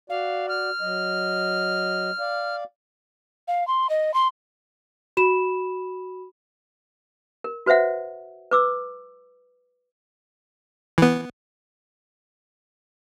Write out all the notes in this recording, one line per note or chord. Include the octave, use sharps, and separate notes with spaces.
F#4 D5 F5
F6
F#3 D#5
D5 F5
F5
C6
D#5
C6
F#4 B5 E7
A#4
F#4 B4 C5 E5 F#5
B4 D6 E6
E3 B3